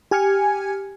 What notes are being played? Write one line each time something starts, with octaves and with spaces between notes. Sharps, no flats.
G4 G#5 F6 G#6 C#7